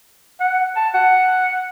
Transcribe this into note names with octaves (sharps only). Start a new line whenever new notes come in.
F#5
A5
F#5